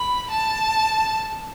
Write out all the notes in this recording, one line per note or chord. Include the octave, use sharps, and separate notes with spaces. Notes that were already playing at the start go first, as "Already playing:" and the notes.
Already playing: B5
A5